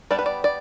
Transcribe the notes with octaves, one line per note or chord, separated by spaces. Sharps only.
G3 B3 D4 D5
B4
D5
D5